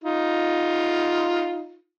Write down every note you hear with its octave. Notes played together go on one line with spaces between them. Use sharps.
D#4 F4